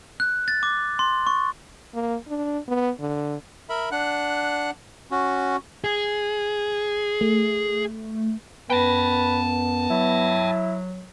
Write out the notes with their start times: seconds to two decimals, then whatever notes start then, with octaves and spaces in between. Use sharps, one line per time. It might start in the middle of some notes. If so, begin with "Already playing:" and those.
0.20 F#6
0.48 A6
0.63 D6
0.99 C6
1.27 C#6
1.95 A#3
2.28 D4
2.68 B3
3.00 D3
3.69 A#4 E5 B5
3.92 D4 F#5 F#6
5.11 C#4 F#4
5.84 G#4
7.21 A3
8.70 F#2 B3 B4 G5 A5
9.90 F#3 E4